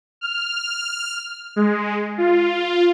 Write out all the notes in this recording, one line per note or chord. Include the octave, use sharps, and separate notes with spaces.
F6
G#3
F4